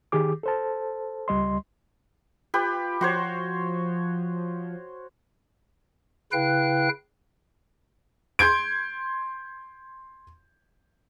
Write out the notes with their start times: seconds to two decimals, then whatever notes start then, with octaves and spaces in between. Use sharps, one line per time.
0.12 D#3 G4 G#4 D6
0.43 A4 C5 A5
1.28 C#2 G3 D#5 C6
2.54 F4 G4 B4
3.01 F3 F#4 C5 C#5
6.32 C#3 E4 B4 F5 G5 F#6
8.39 C6 G6 G#6 D7